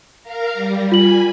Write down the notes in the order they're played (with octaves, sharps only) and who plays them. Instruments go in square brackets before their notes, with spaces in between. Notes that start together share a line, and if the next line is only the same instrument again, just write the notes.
[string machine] A#4 F5 A#5
G3
[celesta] F4 F#7 [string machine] G#5 B5